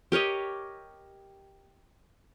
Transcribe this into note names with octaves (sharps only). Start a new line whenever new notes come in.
G4 A#4 C#5 D#5